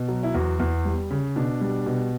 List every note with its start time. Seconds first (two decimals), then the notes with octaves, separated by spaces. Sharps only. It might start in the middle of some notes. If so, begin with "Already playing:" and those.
Already playing: B2
0.08 F#3
0.23 E4
0.34 E2 F#4
0.59 E2
0.85 G3
1.11 C#3
1.36 B2 D4
1.61 G3
1.86 B2